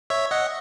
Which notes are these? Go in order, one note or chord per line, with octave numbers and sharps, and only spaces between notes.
C#5 E5
D#5 F#5